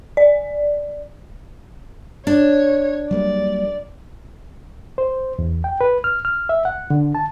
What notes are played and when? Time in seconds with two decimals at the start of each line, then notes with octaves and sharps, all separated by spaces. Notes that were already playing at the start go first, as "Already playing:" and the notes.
0.17 D5
2.27 D4 C#5
3.11 F#3 G3 A#3 D5
4.98 C5
5.39 E2
5.64 G5
5.81 B4
6.04 F6
6.25 F6
6.49 E5
6.65 F#5
6.90 D3
7.15 A5